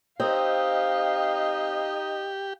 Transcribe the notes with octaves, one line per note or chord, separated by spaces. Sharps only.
C4 D#4 G4 D#5 F5